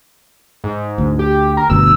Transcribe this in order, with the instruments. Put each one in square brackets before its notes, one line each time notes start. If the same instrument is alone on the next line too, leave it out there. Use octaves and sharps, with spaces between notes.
[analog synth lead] G#2
[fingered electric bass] D2
[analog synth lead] G4
A#4
[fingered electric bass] G1 D2 B2 [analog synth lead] E6